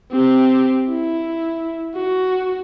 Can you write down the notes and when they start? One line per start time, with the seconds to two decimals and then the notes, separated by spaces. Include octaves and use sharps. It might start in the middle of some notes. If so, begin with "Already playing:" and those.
0.12 C4 G4
0.89 E4
1.95 F#4